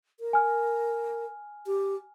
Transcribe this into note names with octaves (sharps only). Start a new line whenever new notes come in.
A#4
G#5 F6
G4